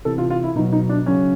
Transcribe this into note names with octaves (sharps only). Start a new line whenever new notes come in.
C3 E3 A4
F4
F4
E4
B2 F#3 D#4
D#4
D4
C#3 F#3 C#4